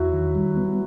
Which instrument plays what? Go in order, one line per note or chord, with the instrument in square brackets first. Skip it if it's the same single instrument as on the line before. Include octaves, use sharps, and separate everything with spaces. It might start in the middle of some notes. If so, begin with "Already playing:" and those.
Already playing: [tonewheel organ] E2 [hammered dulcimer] F#3 E4 F#4
[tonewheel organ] D#3
G3
B3